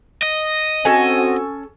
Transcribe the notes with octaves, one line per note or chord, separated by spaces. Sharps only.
D#5
C4 C#4 F#4 A4 G#5